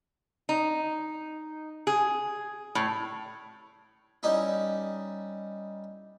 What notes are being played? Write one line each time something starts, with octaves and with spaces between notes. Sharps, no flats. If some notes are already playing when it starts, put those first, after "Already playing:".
D#4
G#4
A2
G3 C#4 D#4 E4